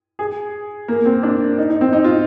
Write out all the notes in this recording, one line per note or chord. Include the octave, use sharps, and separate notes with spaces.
G#4
A#3
C4
D4
D#4
D#4
C4
D#4
F4